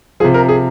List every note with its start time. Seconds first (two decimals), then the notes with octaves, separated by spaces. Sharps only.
0.20 F3 G#4
0.24 C3
0.34 A#4
0.49 G#4